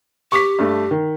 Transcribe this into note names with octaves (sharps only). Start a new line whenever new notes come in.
G4 C#6 D6 B6
G2 A3
D#3